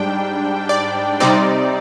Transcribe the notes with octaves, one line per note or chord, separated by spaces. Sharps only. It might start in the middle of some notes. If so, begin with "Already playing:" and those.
Already playing: G#2 G3 D4 G5
D5
C3 G3 C4 D#4 D5